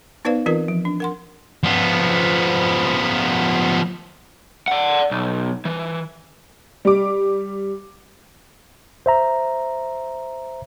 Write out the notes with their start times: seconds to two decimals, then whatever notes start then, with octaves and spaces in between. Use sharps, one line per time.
0.25 B3 D#4 B4 C5 D5 F5
0.46 E3 C4 F4 A#4 B4
0.68 F3
0.85 D4
1.00 A#4 F#5 C6
1.63 F3 B3
4.68 D5 F#5
5.11 B1
5.65 E3
6.85 G3 D6
9.06 C5 E5 A#5